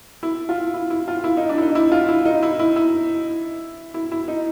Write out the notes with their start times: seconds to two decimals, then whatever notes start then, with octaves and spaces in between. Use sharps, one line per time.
0.23 E4
0.49 F4
0.74 E4
0.90 E4
1.08 F4
1.24 E4
1.37 D#4
1.49 D4
1.58 E4
1.62 D#4
1.75 E4
1.92 F4
2.09 E4
2.25 D#4
2.43 E4
2.59 E4
2.76 E4
3.94 E4
4.12 E4
4.28 D#4